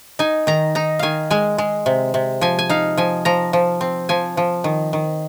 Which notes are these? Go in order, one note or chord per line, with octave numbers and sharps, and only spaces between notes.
D#4 G#5
D#3 A#5
D#4 A#5
D#3 F5 G#5
G#3 G#5
G#3
C3
C3
F3 G#5
G#5
D#4 F5
F3 G#5
F3 A#5
F3
C4
F3 G#5
F3
D#3
D#3